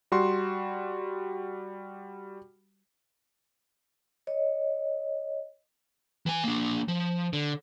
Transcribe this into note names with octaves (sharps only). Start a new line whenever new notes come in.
G3 F#4 C6
C#5 D#5
E3 G#5
A#3 D4
F3
D3